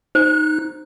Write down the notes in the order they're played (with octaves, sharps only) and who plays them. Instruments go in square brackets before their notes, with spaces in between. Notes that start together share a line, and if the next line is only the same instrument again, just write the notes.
[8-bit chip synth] D#4 F#6 [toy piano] C5